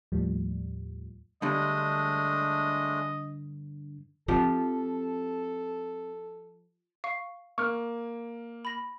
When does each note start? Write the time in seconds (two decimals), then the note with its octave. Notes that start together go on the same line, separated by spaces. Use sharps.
0.12 D#2 A2 F3 G3
1.42 G2 D3 G#3 A3 D4 D#5
4.28 F3 C4 F4 G4 A4
7.04 F5 C#6
7.58 A#3 C#6 F6
8.65 B5 A#6